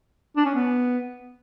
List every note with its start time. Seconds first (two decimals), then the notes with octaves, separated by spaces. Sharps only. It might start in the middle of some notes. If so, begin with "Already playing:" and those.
0.36 D4
0.45 C#4
0.55 B3